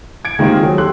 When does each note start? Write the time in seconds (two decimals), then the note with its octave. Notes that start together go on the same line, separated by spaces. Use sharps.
0.25 G#6 D7
0.39 D#3 G#3 A#3 C4 F4 G4
0.61 F#3 G#4
0.78 G4 A4 C6 F#6